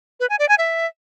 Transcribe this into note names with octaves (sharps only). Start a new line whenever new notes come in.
B4
G#5
D5
G#5
E5